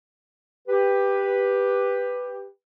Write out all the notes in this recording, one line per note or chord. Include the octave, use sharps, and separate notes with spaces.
G4 B4